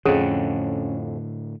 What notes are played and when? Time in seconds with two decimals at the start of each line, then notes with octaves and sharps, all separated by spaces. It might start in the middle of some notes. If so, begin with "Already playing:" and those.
0.06 F2 A2 D3 C#4 G#4 F#5